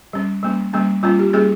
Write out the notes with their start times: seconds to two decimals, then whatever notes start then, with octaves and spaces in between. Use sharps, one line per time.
0.13 G3 C#4
0.43 G3 A#3 C#4
0.73 G3 A#3 C#4
1.03 G3 A#3 C#4 F4
1.19 G4
1.33 G3 A#3 C#4 G#4